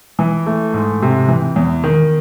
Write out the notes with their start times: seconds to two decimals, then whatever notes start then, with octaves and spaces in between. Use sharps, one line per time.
0.19 E3
0.46 A3
0.74 G#2
1.02 C3
1.28 E3
1.56 E2
1.84 D#3